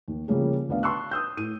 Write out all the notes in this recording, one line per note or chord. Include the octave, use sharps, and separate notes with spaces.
D#2
C#3 F3 G3 A#3 C#4 G#4
D2 B3 D4 F5
A5 C6 C#6 E6 F#6
D#6 E6 G6
A2 D#7